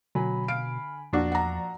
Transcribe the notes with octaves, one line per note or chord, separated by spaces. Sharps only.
B2 D3 F#3 G#5 B5
F5 D7
E2 A#2 F3 D4 F#4
F#5 A#5